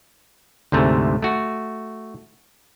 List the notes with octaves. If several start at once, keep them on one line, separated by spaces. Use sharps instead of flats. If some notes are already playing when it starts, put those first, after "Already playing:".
D2 G#2 C3 A3
A3 F#4